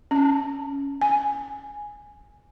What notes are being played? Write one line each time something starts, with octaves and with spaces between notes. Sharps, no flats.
C#4 A5
G#5